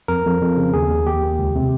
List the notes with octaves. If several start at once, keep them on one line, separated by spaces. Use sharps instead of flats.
F2 A#4
F2
F2
C#3
D#2 G#4
D#2
D#2 G4
D#2
C#2
C3